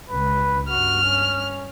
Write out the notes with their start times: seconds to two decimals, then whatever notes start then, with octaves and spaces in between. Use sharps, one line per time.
0.10 C#2 B4
0.69 G2 F#4 F6
1.03 C#4